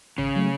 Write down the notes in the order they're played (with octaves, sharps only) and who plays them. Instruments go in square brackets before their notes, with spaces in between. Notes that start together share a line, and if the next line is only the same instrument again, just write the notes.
[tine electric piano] G#1 [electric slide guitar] C#3
[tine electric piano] F#3 A3